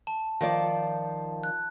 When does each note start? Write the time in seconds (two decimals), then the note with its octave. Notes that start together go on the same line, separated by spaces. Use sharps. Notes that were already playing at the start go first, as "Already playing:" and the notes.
0.07 A5
0.41 D#3 F3 D5
1.44 F#6